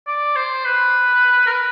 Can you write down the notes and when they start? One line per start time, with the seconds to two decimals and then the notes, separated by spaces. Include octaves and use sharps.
0.07 D5
0.36 C5
0.65 B4
1.47 A#4
1.52 B4